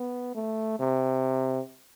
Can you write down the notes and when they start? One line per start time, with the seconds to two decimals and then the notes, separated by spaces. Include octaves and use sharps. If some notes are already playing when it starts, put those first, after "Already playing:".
Already playing: B3
0.35 A3
0.80 C3